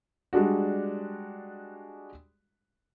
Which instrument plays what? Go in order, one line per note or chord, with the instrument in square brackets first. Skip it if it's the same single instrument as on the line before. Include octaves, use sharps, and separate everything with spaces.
[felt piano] G3 G#3 D4 F#4